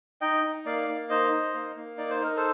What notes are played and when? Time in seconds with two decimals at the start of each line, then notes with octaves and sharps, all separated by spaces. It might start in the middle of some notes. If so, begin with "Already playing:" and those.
0.21 D#4 D#5 G5
0.44 D#4
0.65 A#3 D5 F5
0.88 A#3
1.09 D#4 C5 D#5
1.31 D#4
1.54 A#3
1.76 A#3
1.97 D#4 D5
2.10 C5
2.20 D#4 A#4
2.36 A4 C5